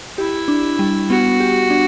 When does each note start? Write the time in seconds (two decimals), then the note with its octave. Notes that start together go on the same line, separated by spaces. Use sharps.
0.18 E4 G4
0.48 D4
0.79 G3
1.10 B3 F#4
1.40 G4
1.70 D4